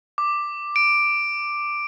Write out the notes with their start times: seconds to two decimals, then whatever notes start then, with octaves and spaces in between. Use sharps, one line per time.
0.18 D6
0.76 D7